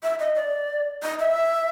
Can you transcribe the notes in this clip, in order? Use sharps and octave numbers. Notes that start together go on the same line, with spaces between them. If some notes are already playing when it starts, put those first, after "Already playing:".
E5
D#5
D5
D#5
E5